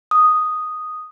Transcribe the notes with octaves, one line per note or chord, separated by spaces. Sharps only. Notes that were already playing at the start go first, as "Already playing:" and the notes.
D#6